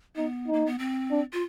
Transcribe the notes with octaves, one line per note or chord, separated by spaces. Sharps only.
B3 D#4
D#4
A#3
B3
C4
D4
F4